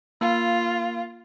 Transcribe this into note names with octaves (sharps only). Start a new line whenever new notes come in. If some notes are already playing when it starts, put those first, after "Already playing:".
A#3 F4